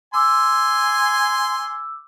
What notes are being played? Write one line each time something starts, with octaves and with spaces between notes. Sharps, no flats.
G#5 C6 D6 E6